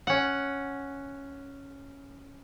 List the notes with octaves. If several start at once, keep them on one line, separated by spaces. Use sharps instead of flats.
C#4 F#5